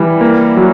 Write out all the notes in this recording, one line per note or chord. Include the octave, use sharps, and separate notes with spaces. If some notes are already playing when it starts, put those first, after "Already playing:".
Already playing: E3 G3
A#3
F#3